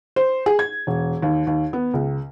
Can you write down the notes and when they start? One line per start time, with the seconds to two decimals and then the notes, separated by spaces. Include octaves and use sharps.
0.16 C5
0.46 G#4
0.59 G#6
0.87 E1
1.22 D#2
1.47 D#2
1.73 B3
1.94 C#2